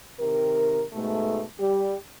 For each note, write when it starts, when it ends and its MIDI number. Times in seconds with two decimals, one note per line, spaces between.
0.19 0.82 48
0.19 0.82 51
0.19 0.82 70
0.93 1.42 44
0.93 1.42 47
0.93 1.42 57
1.59 1.95 55
1.59 1.95 67